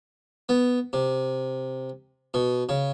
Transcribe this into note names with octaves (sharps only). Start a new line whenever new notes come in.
B3
C3
B2
C#3